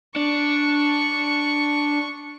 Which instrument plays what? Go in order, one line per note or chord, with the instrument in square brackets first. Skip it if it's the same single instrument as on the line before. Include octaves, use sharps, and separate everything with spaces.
[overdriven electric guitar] D4 [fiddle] C#6